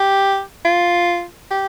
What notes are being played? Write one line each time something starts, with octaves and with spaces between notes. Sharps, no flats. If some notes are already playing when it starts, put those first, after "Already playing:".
Already playing: G4
F4
G4